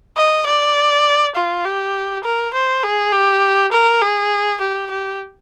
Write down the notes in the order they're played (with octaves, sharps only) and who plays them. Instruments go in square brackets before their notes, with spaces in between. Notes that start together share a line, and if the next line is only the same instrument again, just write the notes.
[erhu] D#5
D5
F4
G4
A#4
C5
G#4
G4
A#4
G#4
G4
G4